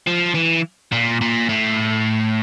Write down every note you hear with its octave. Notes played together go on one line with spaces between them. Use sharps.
F3
E3
A#2
A#2
A2